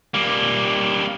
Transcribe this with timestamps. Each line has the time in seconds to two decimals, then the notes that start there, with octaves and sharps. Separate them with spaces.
0.14 G3 A#3